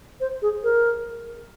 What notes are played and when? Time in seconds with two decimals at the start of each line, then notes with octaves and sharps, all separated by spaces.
0.20 C5
0.42 G#4
0.64 A#4